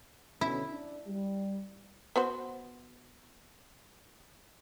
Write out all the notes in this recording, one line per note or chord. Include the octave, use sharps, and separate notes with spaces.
B2 D3 C#4 E4
D4
G3
B3 F#4 C5